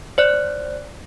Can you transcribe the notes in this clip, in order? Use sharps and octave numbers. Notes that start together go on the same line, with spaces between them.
C5 D5 F#6